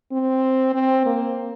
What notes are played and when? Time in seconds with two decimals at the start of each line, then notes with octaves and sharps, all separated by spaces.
0.12 C4
0.74 C4
1.06 A#3